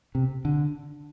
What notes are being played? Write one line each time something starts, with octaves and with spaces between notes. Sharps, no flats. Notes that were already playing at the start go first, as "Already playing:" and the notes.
C3
D3